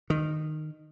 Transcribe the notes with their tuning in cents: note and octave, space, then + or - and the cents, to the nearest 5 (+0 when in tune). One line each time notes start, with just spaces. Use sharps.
D#3 -15